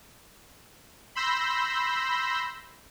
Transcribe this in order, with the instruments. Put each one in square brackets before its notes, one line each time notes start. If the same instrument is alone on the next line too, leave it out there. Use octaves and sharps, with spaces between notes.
[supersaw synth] B5 C6 E6 G6 A#6